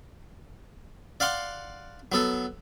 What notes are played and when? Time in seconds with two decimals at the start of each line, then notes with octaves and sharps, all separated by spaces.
1.20 D5 F5 F#5 C6 D6
2.12 F#3 B3 A4